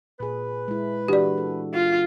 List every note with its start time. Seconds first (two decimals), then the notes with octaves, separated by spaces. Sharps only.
0.20 A#2 G#4 B4
0.68 G#3 E4
1.08 E3 D4 F#4 G4 D5
1.37 A4
1.74 F4